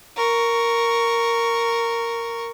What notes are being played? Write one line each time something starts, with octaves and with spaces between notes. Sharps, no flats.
A#4 C#6